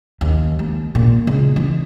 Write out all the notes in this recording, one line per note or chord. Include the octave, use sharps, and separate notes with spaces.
D#2
D#2
A#2
C#2
E3